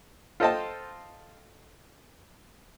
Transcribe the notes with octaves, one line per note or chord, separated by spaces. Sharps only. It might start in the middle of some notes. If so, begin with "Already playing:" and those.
F4 A4 C5 D#5 G5 A5